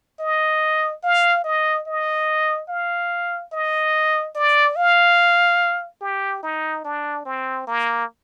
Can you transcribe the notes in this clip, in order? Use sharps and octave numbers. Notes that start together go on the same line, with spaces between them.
D#5
F5
D#5
D#5
F5
D#5
D5
F5
G4
D#4
D4
C4
A#3